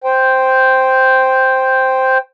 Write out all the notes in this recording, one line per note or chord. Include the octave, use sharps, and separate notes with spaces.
C5 G5